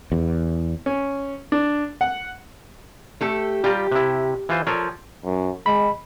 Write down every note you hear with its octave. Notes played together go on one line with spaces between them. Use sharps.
E2
C#4
D4
F#5
A3 G4 A4
G3 F4 G4 A#5
C3 E4
E3 F4 C5
F3 A4 A#4 C#5
F#2
G#3 B5